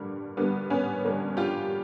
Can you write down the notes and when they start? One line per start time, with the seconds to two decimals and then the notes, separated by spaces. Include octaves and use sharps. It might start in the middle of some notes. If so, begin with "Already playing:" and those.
Already playing: G2 D3 G3 A#3
0.37 G2 D3 G3 A#3 B3
0.70 B3 C#4
1.04 G2 D3 G3 A#3
1.37 F4 G4